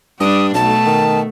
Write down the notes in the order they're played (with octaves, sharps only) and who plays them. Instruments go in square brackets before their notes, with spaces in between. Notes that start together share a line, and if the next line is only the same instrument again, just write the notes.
[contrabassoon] G2 [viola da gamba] G3 D4 [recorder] D#6
[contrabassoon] B1 [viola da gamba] B2 A3 [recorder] A5
[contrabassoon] D#3